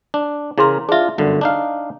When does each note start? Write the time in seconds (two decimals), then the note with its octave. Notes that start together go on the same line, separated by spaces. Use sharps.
0.14 D4
0.58 C#3 E4 G#4 A#4 C6
0.89 D4 F4 G#4 E5
1.18 G1 F#2 D3
1.41 D4 D#4 F5